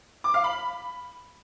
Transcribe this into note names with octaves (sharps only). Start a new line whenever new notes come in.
D6
F5
B5